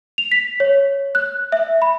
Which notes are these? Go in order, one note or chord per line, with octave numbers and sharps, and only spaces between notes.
F7
B6
C#5
F#6
E5
B5